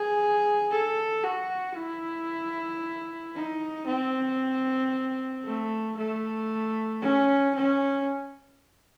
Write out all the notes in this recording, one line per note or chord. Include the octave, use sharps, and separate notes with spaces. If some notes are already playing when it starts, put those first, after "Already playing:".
Already playing: G#4
A4
F#4
E4
D#4
C4
A3
A3
C#4
C#4